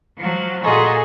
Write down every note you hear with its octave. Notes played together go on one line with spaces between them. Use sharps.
F3 F#3
A#2 F#4 G#4 A4 D#5 A#5 C6 C#6